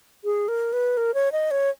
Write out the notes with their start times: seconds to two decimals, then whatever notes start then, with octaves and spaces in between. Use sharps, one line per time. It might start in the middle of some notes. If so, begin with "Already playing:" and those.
0.24 G#4
0.48 A#4
0.73 B4
0.97 A#4
1.14 C#5
1.32 D#5
1.51 C#5